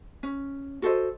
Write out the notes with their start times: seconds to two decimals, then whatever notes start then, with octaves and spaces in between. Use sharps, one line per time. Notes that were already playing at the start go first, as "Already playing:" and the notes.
0.23 C#4
0.82 F#4 A4 C5 D#5